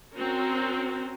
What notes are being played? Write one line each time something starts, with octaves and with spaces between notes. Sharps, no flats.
C4 C#4 F#4 A#4